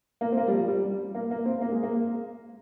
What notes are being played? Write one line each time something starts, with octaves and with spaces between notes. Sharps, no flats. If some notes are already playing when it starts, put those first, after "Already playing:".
A#3
C4
A#3
G3
F3
G3
A#3
A#3
C4
A#3
G#3
A#3